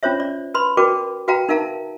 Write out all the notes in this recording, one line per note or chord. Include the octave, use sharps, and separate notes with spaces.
C#4 F4 C5 C#5 E5
D5
B4 B5 C6
F#4 A#4 B4 D5 G5 D6
F#4 B4 F5 G5 A#5
D#4 A#4 E5 F5 A5 A#5